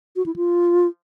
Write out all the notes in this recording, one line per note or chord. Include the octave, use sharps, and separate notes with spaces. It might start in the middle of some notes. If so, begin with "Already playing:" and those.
F#4
E4
F4